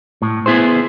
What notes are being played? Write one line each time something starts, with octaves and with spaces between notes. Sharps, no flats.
A2
B3 E4 G#4 C5